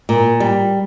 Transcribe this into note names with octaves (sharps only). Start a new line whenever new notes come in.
A#2
G3